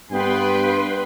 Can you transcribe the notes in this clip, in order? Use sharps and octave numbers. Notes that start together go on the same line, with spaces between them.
G2 B3 B4 G5 C6